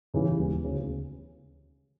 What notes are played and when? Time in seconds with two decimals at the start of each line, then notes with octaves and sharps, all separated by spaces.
0.14 E2 C#3 E3 G3
0.39 E1
0.64 D2 C#3